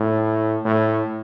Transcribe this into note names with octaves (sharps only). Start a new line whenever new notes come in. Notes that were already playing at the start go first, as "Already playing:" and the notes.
Already playing: A2
A2